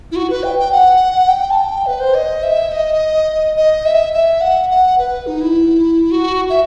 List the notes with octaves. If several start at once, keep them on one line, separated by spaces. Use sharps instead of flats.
E4
F#4
B4
G5
G5
F#5
G5
A5
G5
B4
C5
D#5
E5
D#5
D#5
E5
E5
F#5
F#5
B4
D#4
E4
F#4
E5